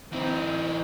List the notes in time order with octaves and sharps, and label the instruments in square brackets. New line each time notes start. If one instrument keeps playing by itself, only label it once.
[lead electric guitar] E3 D#4 [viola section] C4